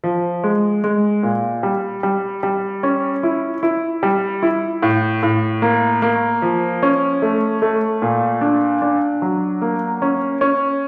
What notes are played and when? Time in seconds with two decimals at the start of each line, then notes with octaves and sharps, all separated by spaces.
0.04 F3
0.43 G#3
0.84 G#3
1.23 A#2
1.63 G3
2.03 G3
2.43 G3
2.83 C#4
3.23 E4
3.63 E4
4.03 G3
4.43 E4
4.83 A2
5.23 A2
5.62 A#3
6.02 A#3
6.42 F3
6.83 C#4
7.22 A3
7.62 A3
8.02 A#2
8.41 D4
8.82 D4
9.22 F#3
9.62 A#3
10.02 C#4
10.41 C#4